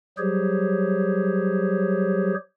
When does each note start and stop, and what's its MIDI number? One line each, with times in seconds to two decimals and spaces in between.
0.18 2.34 54
0.18 2.34 55
0.18 2.34 67
0.18 2.34 68
0.18 2.34 72
0.18 2.34 73